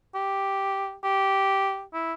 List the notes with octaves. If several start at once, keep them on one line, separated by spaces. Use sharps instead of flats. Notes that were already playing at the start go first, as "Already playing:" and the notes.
G4
G4
E4